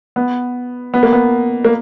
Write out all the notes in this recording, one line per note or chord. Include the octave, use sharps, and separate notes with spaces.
B3
B3
A#3
B3
A#3